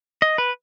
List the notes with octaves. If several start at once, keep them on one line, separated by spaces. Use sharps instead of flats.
D#5
B4